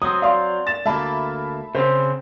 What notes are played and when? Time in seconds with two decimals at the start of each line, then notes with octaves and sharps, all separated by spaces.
0.02 F#3 C4 D#6
0.22 D5 F5 C6
0.67 A6 E7
0.86 D2 A#3 E5 A5 B5
1.75 C#3 C4 C5